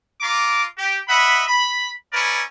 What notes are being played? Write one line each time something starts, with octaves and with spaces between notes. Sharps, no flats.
F4 A#5 D6
G4
D#5 E5 F#5 B5
B5
C#4 E4 A#4 B4 D5